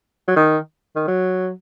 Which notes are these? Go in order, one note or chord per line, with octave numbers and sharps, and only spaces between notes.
F#3
D#3
D#3
F#3